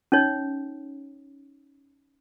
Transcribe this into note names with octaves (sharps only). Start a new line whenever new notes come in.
C#4 D#4 C#5